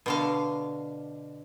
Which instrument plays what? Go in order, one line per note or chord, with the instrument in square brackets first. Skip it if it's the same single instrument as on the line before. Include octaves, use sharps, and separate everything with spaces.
[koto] B2 D3 F5